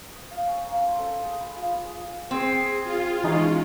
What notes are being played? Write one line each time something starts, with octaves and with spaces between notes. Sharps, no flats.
D#6
F5
C#4
A#3
C5
A4
G#4
B4
F4
D#6
G#4
C4 G#4
F4
E3 G#3 C#4 D#4 G#4